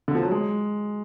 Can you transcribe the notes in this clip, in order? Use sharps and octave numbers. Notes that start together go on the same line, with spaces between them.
D3
F3
F#3
G#3